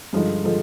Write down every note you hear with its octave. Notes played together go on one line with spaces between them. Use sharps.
G2 D3 F3 G#3 D#4
D3 F3 G#3